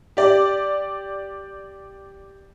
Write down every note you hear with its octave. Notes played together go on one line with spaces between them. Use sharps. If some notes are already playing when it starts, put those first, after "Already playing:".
G4 D5